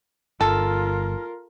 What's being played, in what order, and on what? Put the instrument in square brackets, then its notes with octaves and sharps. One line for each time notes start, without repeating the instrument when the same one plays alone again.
[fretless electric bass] G1 [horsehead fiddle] F4 A#4 [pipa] A4